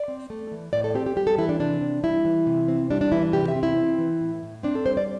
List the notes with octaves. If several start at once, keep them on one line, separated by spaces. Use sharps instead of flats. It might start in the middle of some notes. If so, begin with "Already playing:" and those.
Already playing: D5
C4
A3
E3
A2 D5
A4
C4 G4
G4
G3 G4
A4
E3 E4
D4
C3 D4
C4
G3 E4
E3
C3
C4
G3 D4
D4
E3 E4
D4
C3 G4
E5
C4
E4
C4
E3
A2
A2
C4 D4
A4
G3 C5
D5